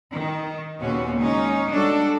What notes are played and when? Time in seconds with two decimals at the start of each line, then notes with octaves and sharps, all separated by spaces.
0.12 D#3
0.80 D#2 A#2 C#3 B3 C#4 F#4
1.19 G#3 C#4 D#4
1.71 G3 D4 F#4 A4